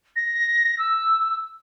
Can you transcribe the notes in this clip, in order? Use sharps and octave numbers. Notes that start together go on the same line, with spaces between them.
A#6
E6